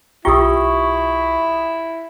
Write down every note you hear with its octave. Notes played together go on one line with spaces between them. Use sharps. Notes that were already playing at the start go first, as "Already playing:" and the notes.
B1 E4 F4 G4 G5 C#6 D#6 E6